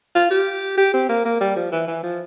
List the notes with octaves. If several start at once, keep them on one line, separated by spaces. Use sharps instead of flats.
F4
G4
G4
C4
A#3
A#3
G3
F3
E3
E3
F3